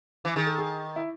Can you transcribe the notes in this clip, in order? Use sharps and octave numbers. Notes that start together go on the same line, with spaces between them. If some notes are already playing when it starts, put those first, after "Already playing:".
E3
D#3 G#4
A4
G#4
E4